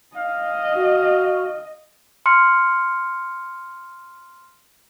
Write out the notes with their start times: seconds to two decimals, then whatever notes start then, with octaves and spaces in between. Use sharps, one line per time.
0.17 D#5 F5
0.76 F#4
2.26 C6 F6 C#7